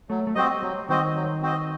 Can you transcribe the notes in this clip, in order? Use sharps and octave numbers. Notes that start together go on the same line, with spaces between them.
F#3 A3
A3
G3 C4 F#4 C5 D#5
F#3 G3
D#3 C4 F#4 C5 D#5
F#3
C4 F#4 C5 D#5